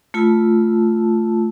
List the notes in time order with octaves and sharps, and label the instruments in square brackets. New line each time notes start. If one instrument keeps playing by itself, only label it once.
[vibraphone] A3 F4 A5 E6